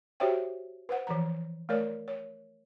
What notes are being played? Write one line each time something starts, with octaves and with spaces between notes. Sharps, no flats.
F#4 G4 C5 C#5 E5 G5
B4 C5 F#5
E3 F3 A#5
A3 A#4 C#5 D5
C#5